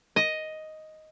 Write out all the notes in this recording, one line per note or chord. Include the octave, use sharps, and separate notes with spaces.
D#5